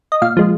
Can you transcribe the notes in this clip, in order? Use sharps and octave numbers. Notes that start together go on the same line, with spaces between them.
D#5
A#2 F5
F3 G#3